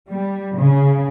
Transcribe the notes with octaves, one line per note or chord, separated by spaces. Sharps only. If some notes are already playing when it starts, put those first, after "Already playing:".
G3
C#3